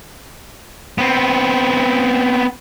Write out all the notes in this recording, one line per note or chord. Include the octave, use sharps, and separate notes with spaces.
B3 C4